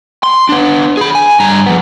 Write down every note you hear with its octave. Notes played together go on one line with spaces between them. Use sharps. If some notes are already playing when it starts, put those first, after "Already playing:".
C6
B3 D4
G#4 B5
G#5
G2 A#5
F3 B3